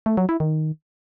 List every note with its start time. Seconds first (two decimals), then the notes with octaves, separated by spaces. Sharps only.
0.06 A3
0.17 F#3
0.29 E4
0.40 D#3